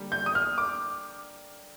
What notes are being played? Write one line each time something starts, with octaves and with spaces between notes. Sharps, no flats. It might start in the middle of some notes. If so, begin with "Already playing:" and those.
Already playing: D3 G3 A#3
G6
D#6
F6
D6